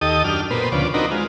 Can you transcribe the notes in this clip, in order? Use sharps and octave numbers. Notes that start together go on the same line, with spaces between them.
D#2 G4 A4 D#5 D#6
F#2 D4 G4 F6
A#2 B3 B4 C5
D2 C#3 F3 D5
C4 D4 D#4 F#4 A#4 B4
G#3 F4